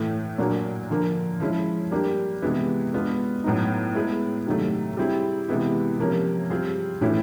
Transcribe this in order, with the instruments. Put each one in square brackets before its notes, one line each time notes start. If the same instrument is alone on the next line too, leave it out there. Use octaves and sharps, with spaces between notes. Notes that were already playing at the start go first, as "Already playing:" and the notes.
Already playing: [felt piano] A2 E3 A3
A#2 F#3 A#3 D4 F#4
D3 F3 A#3
F3 G#3 C#4 E4 G#4
G3 A#3 D4 G4
C3 E3 G#3 B3 E4
G#3 B3 D4 F4
A2 F#3 B3 D#4
G#3 B3 E4 G#4
C3 D#3 F#3 A3
G3 C4 E4 G#4
C3 E3 G#3 B3 E4
C3 F3 A#3 C#4
G3 C4 F4 G#4
A2 E3 A3 C#4 E4